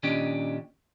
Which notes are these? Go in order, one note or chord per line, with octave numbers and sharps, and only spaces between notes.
A#2 D#3 C#4 D4 G4 D#5